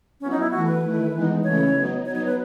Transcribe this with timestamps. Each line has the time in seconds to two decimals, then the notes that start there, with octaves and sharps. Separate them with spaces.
0.21 F#3 B3 C#4 E4
0.31 D#4
0.41 E4
0.51 E3 A3 E4 F#4
0.67 B4
0.82 D#3 A3 E4
1.13 E3 G#3 B3 D#4
1.44 C#3 E3 A3 C#4 E4 C#5
1.75 F#3 B3 D#4
2.05 F#3 B3 D#4 C#5
2.15 C#5
2.26 B4